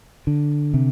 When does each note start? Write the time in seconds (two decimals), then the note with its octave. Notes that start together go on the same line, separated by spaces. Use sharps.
0.27 D3
0.74 C3